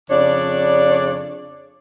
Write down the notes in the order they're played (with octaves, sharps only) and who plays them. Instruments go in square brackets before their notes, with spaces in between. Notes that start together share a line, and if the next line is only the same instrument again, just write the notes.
[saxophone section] F2 C#3 D4 C#5 D5